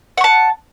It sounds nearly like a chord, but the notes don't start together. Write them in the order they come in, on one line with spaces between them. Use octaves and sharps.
F#5 C#6 A5